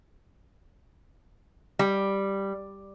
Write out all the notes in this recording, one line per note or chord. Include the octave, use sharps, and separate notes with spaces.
G3